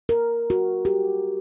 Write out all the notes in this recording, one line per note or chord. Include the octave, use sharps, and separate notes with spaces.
A#4
F#4
G4